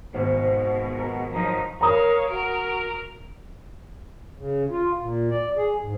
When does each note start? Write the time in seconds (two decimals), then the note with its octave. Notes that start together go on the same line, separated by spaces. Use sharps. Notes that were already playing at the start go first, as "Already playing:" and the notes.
0.14 G#1 B2 G#3 C5 F5
0.98 A#4
1.33 F3 F#3 D#4 A#5
1.81 A#4 C#5 F5 A#5 D#6
2.29 F#4 A#4 D7
4.38 C#3
4.71 F4
5.00 A#2
5.30 D5
5.57 G#4
5.83 G#2